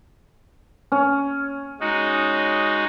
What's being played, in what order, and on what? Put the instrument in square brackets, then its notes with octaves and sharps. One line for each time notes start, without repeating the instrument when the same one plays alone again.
[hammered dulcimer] C#4
[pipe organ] G#3 D#4 F#4